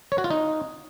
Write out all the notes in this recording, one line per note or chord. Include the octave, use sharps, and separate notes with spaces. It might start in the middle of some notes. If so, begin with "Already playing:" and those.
C#5
F#4
F4
D#4